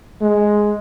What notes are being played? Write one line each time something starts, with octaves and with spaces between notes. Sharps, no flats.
G#3